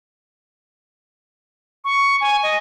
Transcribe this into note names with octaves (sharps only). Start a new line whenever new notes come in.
C#6
G#5
D#5